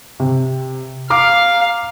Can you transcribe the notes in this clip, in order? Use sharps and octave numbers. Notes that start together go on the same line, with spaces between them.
C3
F5 A#5 D6 F6